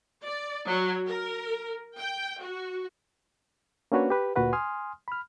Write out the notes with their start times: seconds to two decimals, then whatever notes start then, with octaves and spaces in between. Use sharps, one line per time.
0.22 D5
0.68 F#3
1.07 A#4
1.97 G5
2.41 F#4
3.92 A#3 C#4 D4 F#4 B4 C#5
4.10 G4 B4
4.36 D2 A#2 F#4 B4 F#5
4.53 G#5 C6 D#6 F6
5.08 B5 F6